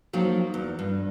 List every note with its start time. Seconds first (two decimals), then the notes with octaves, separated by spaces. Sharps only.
0.13 F3 F#3 A#3 D#4 F4
0.54 E2
0.79 G2